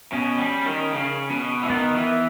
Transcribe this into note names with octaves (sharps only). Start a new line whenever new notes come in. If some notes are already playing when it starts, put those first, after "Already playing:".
B2 C#4
G3
D#3
C#3
B2
E3
D#3 B3
E3